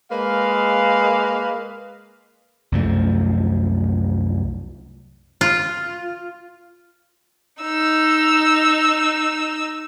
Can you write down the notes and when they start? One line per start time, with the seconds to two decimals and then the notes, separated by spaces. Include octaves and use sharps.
0.11 G#3 A#3 B4 F5
2.72 C2 F#2 F3 A3
5.41 F4
7.62 D#4 E6